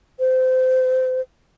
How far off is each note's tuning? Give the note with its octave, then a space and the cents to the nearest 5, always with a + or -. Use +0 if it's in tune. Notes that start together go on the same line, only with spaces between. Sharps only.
C5 -25